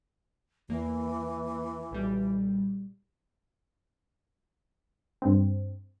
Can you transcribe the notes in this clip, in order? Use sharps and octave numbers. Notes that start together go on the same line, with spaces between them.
E2 E3 A#3
B1 A#2 G3
G2 C4